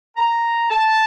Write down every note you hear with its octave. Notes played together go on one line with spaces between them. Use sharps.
A#5
A5